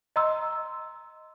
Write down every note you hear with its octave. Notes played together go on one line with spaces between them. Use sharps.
D#5 A#5 C6 E6